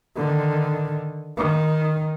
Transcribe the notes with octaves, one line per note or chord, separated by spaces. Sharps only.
D3 D#3
D#3